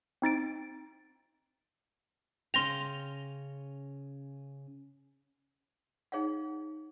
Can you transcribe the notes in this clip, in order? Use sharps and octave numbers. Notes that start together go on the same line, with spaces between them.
C4 D#4 A6 D7
C#3 C#4 G5 C6 A#6 F7
D#4 G#4 C#5 F5 F#5